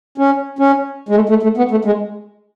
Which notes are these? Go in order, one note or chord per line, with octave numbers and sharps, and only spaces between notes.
C#4
C#4
G#3
A3
A3
A3
B3
A3
G#3